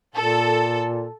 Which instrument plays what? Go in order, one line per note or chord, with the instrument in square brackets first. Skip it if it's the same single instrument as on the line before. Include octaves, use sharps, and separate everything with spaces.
[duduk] A#2 [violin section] A4